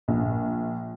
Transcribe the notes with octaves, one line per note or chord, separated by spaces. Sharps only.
A#1